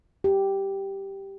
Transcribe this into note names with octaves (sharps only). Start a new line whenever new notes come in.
G4